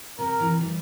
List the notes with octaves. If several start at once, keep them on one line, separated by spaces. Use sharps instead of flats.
C3 A#4
C3 E3
E3 G3